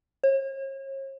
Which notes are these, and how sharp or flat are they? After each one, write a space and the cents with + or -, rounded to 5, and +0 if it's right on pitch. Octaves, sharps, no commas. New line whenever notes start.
C#5 -40